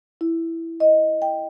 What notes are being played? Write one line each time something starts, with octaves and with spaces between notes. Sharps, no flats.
E4
D#5
G5